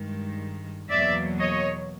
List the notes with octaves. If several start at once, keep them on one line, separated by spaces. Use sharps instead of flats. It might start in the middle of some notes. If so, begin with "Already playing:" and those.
Already playing: G2 D#3 G#3
E2 B2 F#3 A#3 D5 E5
C#5 D#5